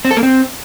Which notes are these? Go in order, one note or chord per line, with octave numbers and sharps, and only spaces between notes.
C4
A4
A#3
C4